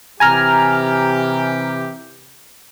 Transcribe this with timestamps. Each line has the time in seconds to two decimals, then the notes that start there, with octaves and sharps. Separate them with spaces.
0.20 C3 E3 G4 G#5 A#5 F6